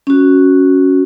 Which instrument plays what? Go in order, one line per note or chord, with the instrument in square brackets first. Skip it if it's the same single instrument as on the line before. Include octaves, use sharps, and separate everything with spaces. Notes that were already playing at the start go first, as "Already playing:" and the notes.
[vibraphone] C#4 F#4